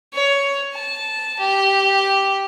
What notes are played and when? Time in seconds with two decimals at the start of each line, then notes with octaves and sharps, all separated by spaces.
0.13 C#5
0.74 A5
1.39 G4